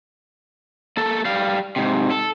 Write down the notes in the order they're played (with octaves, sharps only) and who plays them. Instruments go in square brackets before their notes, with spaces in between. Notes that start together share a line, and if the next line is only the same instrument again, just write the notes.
[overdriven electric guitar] A#3 A4
G3 F5
G#2 C3
A4